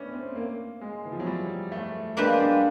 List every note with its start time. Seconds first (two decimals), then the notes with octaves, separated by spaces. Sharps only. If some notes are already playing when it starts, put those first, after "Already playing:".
Already playing: A3 B3 C#4 D4
0.13 C4
0.35 A#3
0.81 G#3
1.05 E3
1.12 F3
1.20 F#3
1.27 G3
1.72 A3
2.17 G#3 A#3 D4 G4 B4
2.40 G3